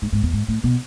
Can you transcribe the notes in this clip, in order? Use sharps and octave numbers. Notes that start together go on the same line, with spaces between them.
G#2
G#2
E2
G#2
A2
B2